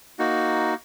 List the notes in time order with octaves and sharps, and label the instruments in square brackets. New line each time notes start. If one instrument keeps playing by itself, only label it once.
[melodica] A#3 D#4 F#4